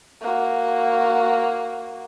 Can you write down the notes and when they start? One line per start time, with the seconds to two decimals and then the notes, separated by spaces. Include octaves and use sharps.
0.21 A#3 F#4